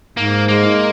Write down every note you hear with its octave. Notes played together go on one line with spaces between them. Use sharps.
G#2 A#3
G#3 A#3